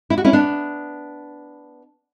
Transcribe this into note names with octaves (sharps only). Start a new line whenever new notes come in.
E4
F#4
C#4 E4
B3 D4